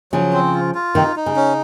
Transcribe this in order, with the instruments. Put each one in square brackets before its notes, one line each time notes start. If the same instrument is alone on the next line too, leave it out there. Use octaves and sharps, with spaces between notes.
[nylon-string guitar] C#3 F3 [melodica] F#3
[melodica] C4
F4
F4
[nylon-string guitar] C3 D#3 [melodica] D#4
[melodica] D#4
[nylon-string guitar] C#3
[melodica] C#4